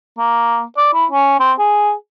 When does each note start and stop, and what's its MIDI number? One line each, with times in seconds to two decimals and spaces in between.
0.19 0.63 58
0.77 0.89 74
0.94 1.05 64
1.12 1.35 61
1.40 1.53 60
1.59 1.92 68